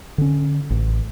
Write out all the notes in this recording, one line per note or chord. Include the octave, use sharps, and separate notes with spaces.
D3 C#4
A1